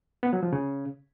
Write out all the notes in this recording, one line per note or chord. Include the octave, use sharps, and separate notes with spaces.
B3
F#3
F3
C#3